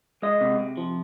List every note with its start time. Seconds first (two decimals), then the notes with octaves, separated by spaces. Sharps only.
0.22 G#3 D#5
0.41 C3
0.59 C3
0.77 F3